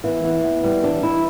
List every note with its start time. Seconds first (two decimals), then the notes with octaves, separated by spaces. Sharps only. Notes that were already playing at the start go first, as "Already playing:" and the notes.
0.04 E2 E3
0.23 E2
0.44 E2
0.64 E3 G3
0.83 E3 D4
1.03 E3 E4